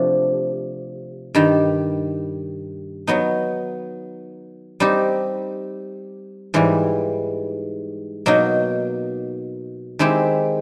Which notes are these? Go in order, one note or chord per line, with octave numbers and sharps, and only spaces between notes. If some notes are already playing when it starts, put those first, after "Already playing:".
Already playing: C3 F3 A3 D4
G2 D#3 G3
F#3 B3 D#4
G3 C4 D#4 G4
G#2 E3 G3
B2 F#3 A#3 D#4
D#3 G#3 C4 E4 G4